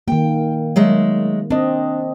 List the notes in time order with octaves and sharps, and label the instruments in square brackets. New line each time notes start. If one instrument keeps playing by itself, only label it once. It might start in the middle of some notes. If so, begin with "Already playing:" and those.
[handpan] D#3 A#3 [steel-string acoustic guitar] G5
[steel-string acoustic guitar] F#3 G#3 A3
[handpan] C4 D#5 [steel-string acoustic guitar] D4